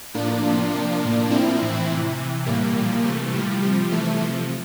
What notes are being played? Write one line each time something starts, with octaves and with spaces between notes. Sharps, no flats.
A2 F3 A#3 D4
C3 F3
C3 F3
A2 F3
A#2 F3 C4 E4
A2 E3
C3 E3
C3 E3
A2 E3 G3 A#3
A#2 F3
C3 E3 A3
A2 F3 G3
C3 F3
C3 E3 A3
C3 F3